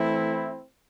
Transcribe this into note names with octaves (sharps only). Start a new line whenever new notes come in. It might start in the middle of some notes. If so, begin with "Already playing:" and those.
Already playing: E3 A3 C4 E4